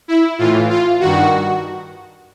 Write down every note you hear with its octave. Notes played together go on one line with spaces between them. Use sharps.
E4
A2 E3 F4
F4
G2 D#3 F#4